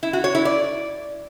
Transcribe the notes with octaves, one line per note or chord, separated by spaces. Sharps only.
E4
F#4
C#5
E4
D5